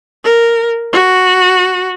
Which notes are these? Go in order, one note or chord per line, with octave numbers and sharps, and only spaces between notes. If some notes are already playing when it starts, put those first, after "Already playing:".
A#4
F#4